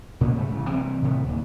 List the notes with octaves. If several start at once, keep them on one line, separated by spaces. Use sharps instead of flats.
A#2 A#3 B3 C#4
G#2 C#3 G3 A3
A1 C#3
C3 E3 F#3 G3
A2 C3 D#3 B3
D1 D#2